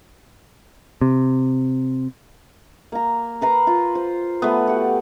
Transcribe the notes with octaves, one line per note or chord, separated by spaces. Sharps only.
C3
A#3 A#5
A#4 B4 A#5 C6
F4
C5
A3 B3
F#4 G4